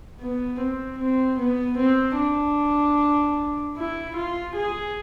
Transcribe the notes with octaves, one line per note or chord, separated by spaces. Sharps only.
B3
C4
C4
B3
C4
D4
E4
F4
G#4